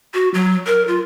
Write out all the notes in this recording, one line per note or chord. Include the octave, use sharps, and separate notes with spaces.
F#4
F#3
A#4
F4